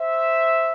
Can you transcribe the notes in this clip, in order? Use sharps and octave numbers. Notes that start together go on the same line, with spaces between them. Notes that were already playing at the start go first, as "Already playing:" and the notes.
Already playing: C5 E5